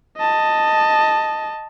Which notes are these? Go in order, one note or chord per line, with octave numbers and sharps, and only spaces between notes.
D#5 A5